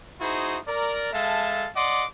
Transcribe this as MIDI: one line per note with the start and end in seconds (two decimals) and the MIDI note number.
0.21 0.58 63
0.21 0.58 64
0.21 0.58 66
0.21 0.58 68
0.21 0.58 72
0.68 1.11 70
0.68 1.11 74
1.13 1.69 56
1.13 1.69 69
1.13 1.69 76
1.13 1.69 77
1.13 1.69 81
1.76 2.05 74
1.76 2.05 75
1.76 2.05 78
1.76 2.05 84
1.76 2.05 86